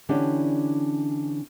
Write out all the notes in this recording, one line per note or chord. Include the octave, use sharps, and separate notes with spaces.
D3 E3 C#4 D4 E4 G4